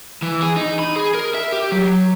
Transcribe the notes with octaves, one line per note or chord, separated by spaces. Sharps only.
E3
G#4
D#4
B5
G#4
A#4
E5
G4
F#3